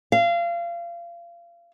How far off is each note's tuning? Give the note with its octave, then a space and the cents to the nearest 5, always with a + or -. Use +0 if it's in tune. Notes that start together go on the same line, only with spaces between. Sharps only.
F5 -30